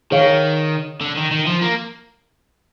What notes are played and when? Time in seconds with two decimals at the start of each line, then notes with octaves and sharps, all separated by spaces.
0.11 D#3 G#4 C#5 F5
1.01 D3
1.16 D#3
1.31 D#3
1.46 F3
1.61 A#3